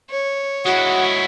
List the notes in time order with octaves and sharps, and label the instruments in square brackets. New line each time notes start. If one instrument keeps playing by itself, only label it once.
[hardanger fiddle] C#5
[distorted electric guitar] G#3 E4 [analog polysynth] F#4 [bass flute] F#5